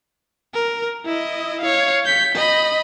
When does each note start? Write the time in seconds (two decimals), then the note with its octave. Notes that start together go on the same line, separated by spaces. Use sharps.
0.54 A#4
1.05 E4 D#5
1.61 C#5 F5
2.05 G6 B6
2.35 D#5 B5